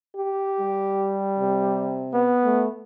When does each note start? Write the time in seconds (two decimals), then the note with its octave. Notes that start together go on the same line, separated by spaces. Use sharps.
0.16 G4
0.60 G3
1.40 C3
2.13 B3
2.44 A3